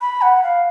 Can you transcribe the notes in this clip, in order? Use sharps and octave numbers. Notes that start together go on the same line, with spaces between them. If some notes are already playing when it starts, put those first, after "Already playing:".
B5
F#5
F5